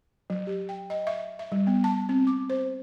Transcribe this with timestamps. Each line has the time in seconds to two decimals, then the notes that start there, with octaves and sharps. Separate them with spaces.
0.30 F#3
0.47 G4
0.69 G5
0.90 D#5
1.07 E5
1.39 E5
1.52 G3
1.67 B3
1.84 A5
2.09 C4
2.27 D6
2.50 C5